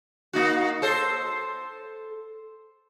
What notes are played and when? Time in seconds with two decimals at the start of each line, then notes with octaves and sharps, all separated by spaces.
0.33 A#3 D#4 F#4
0.82 A4 C5